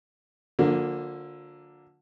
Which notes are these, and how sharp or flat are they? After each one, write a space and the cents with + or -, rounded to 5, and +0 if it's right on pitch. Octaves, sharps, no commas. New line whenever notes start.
D3 +0 F3 +45 A#3 +0